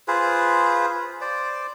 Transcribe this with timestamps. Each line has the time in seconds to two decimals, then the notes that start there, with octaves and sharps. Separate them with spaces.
0.08 F4 G#4 B4 C5
1.21 C5 D5